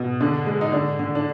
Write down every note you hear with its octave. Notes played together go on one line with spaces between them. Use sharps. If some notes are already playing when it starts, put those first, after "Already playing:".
Already playing: B2
D3 D4
G#3
D#4
D3 D4
D3
D4